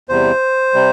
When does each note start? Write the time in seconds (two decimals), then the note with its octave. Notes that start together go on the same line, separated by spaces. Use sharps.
0.09 E2 C3 G3 C5
0.74 C3 G3